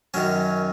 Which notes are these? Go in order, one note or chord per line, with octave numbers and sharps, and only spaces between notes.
F#2 D#3 F#3 C#4